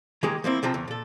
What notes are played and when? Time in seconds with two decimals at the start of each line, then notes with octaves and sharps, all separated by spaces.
0.23 D#3 G#3 A#3 G4 G#4
0.44 F3 A#3 C4 E4
0.63 C3 F3 C4 A#5
0.74 E2
0.88 A#2 A4